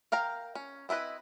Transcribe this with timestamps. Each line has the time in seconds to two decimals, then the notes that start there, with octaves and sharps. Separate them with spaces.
0.12 A#4 F5 G5 A#5
0.55 C#4
0.89 C4 E4 F4 B4 D#5